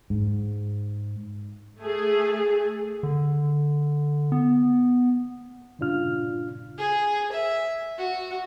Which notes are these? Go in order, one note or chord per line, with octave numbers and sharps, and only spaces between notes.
G#2
A3 G#4
D3
B3
G2 A#2 C#3 D4 F4 F6
G#4
E5
F#4